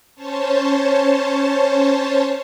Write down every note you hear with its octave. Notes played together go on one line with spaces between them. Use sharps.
C#4 C5 C#5 A5